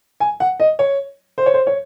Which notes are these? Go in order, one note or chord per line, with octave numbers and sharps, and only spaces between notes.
G#5
F#5
D#5
C#5
C5
C#5
C5
C#5